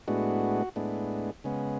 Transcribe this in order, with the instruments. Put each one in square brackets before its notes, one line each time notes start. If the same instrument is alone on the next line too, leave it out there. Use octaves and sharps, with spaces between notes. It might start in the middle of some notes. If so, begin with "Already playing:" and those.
[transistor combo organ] A2 G#3 B3 D4 F#4
A2 G#3 B3 D4
C#3 G#3 B3